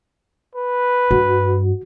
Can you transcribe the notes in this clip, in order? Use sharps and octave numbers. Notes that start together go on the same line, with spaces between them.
B4
G2 F#4